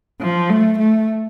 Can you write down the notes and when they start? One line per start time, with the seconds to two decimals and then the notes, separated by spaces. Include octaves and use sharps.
0.20 F3
0.50 A3
0.79 A3